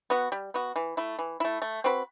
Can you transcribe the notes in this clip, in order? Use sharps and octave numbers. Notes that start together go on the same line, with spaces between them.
B3 F#4
G3
B3 F#4
E3
A3 E4
E3
A3 E4
A3
C4 F#4 B4